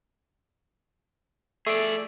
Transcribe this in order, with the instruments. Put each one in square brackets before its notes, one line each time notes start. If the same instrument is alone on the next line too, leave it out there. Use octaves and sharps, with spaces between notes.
[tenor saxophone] A3 [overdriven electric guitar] G#4 D5